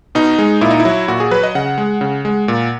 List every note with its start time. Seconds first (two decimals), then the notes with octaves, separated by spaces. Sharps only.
0.15 B2 D#4
0.39 G#3
0.61 A#2 E4
0.71 D#4
0.80 E4
0.85 F#3
1.08 A#2 F#4
1.20 G#4
1.31 F#3 B4
1.43 D#5
1.55 C#3 F#5
1.78 G#3
2.01 C#3
2.25 G#3
2.48 A#2